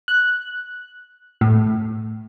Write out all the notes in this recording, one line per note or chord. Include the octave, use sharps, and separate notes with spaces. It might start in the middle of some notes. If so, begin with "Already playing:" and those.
F#6
A2